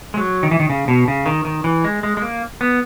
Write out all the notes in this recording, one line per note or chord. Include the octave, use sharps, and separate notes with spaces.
G#3
F#3
D#3
E3
D#3
C#3
B2
C#3
D#3
D#3
E3
G#3
G#3
G#3
A#3
B3